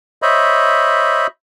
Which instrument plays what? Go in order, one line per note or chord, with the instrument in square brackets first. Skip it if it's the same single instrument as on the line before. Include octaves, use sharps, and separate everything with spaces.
[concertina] C5 C#5 D#5 E5 B5